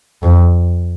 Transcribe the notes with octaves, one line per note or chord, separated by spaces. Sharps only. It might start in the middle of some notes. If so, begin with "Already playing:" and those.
F2